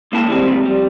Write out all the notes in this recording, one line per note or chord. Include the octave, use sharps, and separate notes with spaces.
C#2 A#3 E4 A5
D#3 G3 G#3 C4
A2 C3 F3
G3